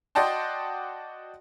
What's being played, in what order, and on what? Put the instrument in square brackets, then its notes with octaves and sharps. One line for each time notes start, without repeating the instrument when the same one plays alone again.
[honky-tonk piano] F#4 D5 D#5 G5 A5 C6